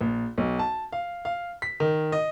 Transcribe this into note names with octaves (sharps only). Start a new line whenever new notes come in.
A#1
B1
A5
F5
F5
B6
D#3
D#5